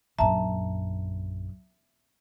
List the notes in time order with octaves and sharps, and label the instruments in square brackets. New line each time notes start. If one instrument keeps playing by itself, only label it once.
[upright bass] A#1 F#2 [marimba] E5 A5 A#5